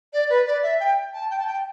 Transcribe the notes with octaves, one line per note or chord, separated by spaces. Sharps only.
D5
B4
D5
E5
G5
A5
G5
A5
G5